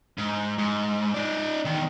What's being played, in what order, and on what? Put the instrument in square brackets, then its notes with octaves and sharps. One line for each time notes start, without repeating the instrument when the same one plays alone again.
[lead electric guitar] G#2
G#2
D#4 D5
E2 D#3